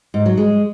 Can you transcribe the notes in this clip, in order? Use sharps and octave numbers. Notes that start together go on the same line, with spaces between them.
G#2
F#3
G#3